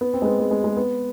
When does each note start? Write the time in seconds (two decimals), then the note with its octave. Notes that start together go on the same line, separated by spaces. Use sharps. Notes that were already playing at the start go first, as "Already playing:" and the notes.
0.01 B3
0.14 C4
0.22 G#3
0.26 B3
0.40 G#3
0.51 G#3
0.64 G#3
0.77 B3